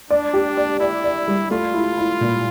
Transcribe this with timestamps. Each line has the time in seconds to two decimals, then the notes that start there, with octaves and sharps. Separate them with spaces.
0.11 D4 D5
0.34 G4
0.57 D5
0.80 E4 D5
1.04 D5
1.28 G3
1.51 A3 F4
1.74 E4
1.98 E4
2.21 A#2